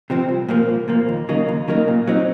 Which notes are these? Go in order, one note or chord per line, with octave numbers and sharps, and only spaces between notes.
C3 F3 C4
C2
A#2 F3 A#3
C2
A#2 F3 A#3
D#2
C#3 F#3 A#3 D#4
D#2
C#3 F#3 A#3 D#4
A#2
F#3 C4 D#4